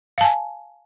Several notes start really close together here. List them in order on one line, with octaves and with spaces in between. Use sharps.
F5 A5 G#5